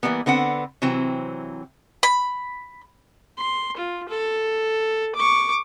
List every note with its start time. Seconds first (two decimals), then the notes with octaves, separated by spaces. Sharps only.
0.03 E3 G3 A#3 B3
0.26 D3 B3 C4 F#5
0.82 C3 E3 F#3 C4
2.03 B5
3.37 C6
3.77 F4
4.09 A4
5.15 C#6 D6